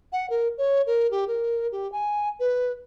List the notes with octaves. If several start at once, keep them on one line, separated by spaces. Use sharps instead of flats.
F#5
A#4
C#5
A#4
G4
A#4
G4
G#5
B4